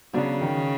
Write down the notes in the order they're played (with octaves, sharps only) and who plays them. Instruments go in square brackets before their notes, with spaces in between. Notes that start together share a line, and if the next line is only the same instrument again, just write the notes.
[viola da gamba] C#3 [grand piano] F#3 B3 D4
[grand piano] D#3